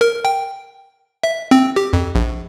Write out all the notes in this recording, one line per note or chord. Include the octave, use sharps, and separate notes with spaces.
A#4
G5
E5
C4
G4
F2
A#1